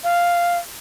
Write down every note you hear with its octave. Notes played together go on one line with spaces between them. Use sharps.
F5